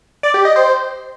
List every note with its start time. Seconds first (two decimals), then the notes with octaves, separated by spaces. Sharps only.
0.23 D5
0.34 G4
0.45 D#5
0.56 C5